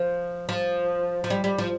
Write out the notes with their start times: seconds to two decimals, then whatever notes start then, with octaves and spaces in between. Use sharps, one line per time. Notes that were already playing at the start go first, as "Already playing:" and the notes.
Already playing: F3
0.49 F3
1.24 F3
1.30 G3
1.44 G3
1.59 F3